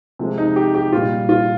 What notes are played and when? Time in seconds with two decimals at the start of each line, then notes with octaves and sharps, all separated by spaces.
0.19 C3 F3 G#3
0.38 D#4
0.56 G4
0.75 G4
0.93 A#2 G3 F4
1.29 F4